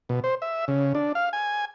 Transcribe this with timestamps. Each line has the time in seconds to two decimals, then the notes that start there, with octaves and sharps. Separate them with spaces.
0.09 B2
0.24 C5
0.42 E5
0.68 C#3
0.95 D4
1.15 F5
1.33 G#5